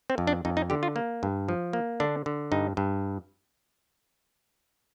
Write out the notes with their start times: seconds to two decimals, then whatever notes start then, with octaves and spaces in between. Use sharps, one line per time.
0.10 C4
0.18 F2
0.27 D4
0.45 F2 D#4
0.57 D#4
0.70 D3 G4
0.83 F4
0.96 A#3
1.23 G2
1.49 F3
1.73 A#3
2.00 D3 D4
2.26 D3
2.52 G2 D#4
2.77 G2